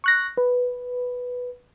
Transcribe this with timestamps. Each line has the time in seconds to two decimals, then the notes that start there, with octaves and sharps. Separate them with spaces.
0.04 C#6 F#6 A#6
0.37 B4